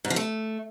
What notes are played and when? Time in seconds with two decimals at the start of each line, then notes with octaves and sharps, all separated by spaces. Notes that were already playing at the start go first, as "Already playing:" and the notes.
0.05 G#2
0.10 F3
0.16 A3